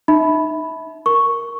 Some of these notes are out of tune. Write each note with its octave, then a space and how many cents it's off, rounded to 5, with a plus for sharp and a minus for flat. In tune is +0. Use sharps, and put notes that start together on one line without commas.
D#4 -25 E5 -20 B5 +0
A#4 +0 C#6 +0